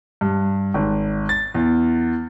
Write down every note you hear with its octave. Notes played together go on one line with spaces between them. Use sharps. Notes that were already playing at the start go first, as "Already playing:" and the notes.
G2
G#1
A6
E2